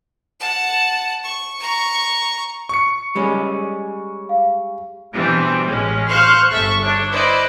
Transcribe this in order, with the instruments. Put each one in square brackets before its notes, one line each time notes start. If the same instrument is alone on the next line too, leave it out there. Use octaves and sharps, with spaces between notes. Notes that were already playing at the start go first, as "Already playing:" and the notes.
[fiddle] F#5 A5
C#6
A#5 C#6
[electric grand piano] C#6 C#7
[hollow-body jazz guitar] G3 G#3 C#4
[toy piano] F5
[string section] B2 E3 G3 C4 D4
A1 G#3 C#4
C5 F5 C6 C#6 F6 F#6
G1 A4 E5 C#6
D4 C#5
E4 B4 C5 D5 D#5